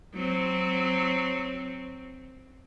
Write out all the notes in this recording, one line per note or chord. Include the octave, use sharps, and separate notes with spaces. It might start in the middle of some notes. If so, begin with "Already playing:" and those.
F#3 C4